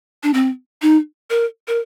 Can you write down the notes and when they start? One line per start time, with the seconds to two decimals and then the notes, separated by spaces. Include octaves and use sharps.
0.23 D4
0.34 C4
0.82 D#4
1.30 A#4
1.68 A#4